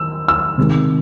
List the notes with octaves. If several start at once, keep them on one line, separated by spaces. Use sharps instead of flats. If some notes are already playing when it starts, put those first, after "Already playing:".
Already playing: D#3 E6
E6
C3 D#3 G#3